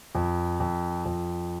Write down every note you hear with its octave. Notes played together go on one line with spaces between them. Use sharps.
F2
F2
F2